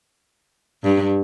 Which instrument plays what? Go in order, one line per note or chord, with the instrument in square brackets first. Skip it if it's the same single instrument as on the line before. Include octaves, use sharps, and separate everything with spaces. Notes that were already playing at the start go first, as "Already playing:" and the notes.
[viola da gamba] G2